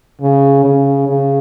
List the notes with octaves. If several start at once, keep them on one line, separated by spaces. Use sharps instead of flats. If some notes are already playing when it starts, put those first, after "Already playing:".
C#3
C#3
C#3